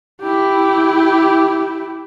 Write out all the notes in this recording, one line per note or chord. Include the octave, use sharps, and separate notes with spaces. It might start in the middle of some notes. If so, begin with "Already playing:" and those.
E4 G4